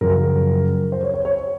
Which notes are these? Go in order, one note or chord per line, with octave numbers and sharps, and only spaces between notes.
F#2 C#3 F3 A#4
C5
C#5
C#5
C#5